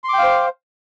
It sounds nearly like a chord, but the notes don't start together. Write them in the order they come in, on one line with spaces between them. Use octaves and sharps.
C6 D6 G5 F5 C5